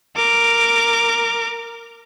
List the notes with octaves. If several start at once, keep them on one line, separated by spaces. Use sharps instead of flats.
A#4 D6